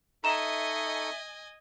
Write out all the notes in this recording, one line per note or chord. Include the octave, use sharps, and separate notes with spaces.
D#4 A4 D#5 E5 G#5 A#5 C#6 E7